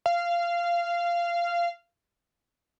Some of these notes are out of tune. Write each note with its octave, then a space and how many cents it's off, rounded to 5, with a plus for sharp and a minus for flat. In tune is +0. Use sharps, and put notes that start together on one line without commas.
F5 -15